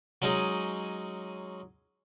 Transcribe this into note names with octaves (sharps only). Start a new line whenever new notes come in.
F#3 G#3 C#4 D#4 G#4